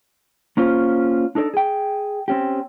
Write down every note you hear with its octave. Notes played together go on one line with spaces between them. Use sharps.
A#3 C#4 F4 C5
D4 D#4 A4 C5 D5
G#4 G5
C4 C#4 G4